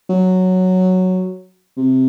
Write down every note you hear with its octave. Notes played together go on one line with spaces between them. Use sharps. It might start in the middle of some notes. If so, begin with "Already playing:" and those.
F#3
C3